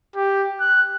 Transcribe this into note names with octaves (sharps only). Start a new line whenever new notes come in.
G4
F#6